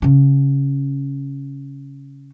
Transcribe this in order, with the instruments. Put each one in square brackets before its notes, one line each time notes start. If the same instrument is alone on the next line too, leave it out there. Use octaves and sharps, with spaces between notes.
[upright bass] C#3 C#4